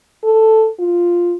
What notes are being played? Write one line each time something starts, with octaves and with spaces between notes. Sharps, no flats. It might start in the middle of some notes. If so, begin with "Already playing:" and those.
A4
F4